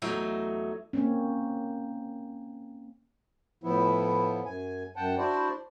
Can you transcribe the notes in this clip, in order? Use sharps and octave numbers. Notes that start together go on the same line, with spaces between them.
E2 F#3 A3 D#4
A#3 C4 C#4
A2 F3 B3 E4
F#2 G#5
F#2 F#5 G5 A5
D4 E4 F#4 C5 D5